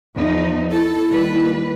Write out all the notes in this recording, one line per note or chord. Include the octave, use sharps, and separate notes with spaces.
E2 F3 D#4
E4 A4
D#2 G3 B4